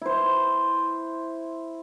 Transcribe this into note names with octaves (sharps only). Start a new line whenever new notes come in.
E4 C5